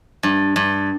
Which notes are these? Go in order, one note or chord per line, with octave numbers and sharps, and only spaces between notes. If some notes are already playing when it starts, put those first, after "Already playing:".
G2
G2